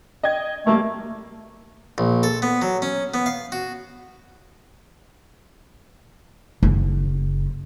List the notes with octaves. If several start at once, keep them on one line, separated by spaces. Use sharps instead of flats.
D#5 G5 G#6
G3 A3 A#3
A#1
A4
B3
F#3
C#4
B3
F5
F#4
F#1